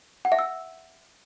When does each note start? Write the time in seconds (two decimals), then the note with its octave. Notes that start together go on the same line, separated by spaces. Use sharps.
0.25 F#5
0.32 E5
0.39 E6